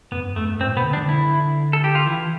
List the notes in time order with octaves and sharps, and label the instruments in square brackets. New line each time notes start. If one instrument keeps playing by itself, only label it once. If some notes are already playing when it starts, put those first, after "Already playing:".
[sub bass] F2 [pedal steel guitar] B3
[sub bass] G2
[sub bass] F2 [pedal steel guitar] A3
[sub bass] G2
[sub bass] A2 [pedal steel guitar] C4
[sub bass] B2 [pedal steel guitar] B3
[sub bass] D3
[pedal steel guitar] D4
[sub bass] D3
[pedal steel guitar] E4
A4
G4
F4
[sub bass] E3 [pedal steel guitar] E4